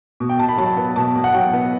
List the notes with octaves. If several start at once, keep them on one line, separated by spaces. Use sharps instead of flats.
B2
G5
B2 A5
B5
F#3 A5
B3
B2 A5
B2
F#5
F#3 G5
B3